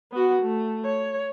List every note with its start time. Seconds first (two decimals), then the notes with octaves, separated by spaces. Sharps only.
0.11 B3 F#4
0.42 A3
0.85 C#5